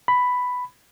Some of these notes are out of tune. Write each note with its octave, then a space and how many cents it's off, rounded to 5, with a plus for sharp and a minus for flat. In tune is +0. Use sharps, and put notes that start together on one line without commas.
B5 +5